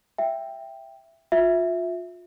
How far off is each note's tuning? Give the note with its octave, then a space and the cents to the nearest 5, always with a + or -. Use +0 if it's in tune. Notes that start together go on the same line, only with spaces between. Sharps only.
E5 +10 G5 +5
F4 +30 E5 +0